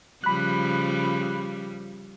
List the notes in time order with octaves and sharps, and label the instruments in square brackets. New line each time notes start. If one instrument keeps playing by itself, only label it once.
[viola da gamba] C#3 F3 G3 [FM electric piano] B5 F#6